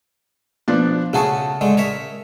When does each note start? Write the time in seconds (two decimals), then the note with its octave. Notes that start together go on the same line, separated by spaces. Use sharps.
0.68 F3 B3 D4
1.13 C#3 A3 F#4 G#4 A5
1.61 D3 G#3 A3
1.77 A#4 C#5 E5